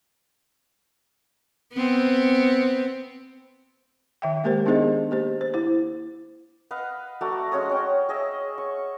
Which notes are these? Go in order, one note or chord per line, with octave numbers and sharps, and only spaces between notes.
B3 C4
D#3 E5 G5
G#3 A#3 G4 A#4 C5
B3 D4 D#4 G#4 C5 D#5
A#3 G4 C5
C5
E4 C5
B4 D#5 F5 F#5
A3 F#4 D5 A#5
G#3 C#4 C#5 D#6
C#4 C#5 F#5 G5
G#4 D#5 E5
C#6